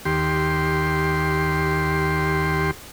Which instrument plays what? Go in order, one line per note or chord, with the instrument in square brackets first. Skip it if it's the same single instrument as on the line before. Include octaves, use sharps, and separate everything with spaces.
[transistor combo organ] D#2 G4 C6